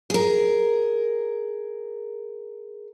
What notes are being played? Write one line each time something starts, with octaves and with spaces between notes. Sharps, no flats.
G#4 A#4